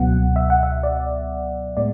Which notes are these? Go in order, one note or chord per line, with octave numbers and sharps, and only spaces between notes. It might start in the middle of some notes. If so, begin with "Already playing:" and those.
Already playing: C#2 B2 F#3 B3 F#5
E5
F#5
E5
D5
A2 G#3 B3 D5